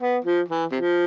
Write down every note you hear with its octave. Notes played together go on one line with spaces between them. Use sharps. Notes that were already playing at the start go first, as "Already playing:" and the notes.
B3
F3
E3
C3 F3